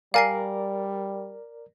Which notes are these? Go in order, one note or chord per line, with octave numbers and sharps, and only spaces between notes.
G3 A#4 D5 F5 G#5 C7